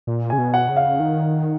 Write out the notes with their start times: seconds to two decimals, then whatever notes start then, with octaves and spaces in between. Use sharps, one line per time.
0.07 A#2
0.30 C#3 G#5
0.38 B2
0.54 F#5
0.69 C#3
0.77 F5
1.00 D#3